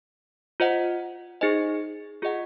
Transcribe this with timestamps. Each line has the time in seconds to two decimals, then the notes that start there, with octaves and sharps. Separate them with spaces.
0.60 F4 C5 D#5 F#5
1.41 D#4 G#4 C5 D#5 G#5
2.22 F4 G#4 D#5 F#5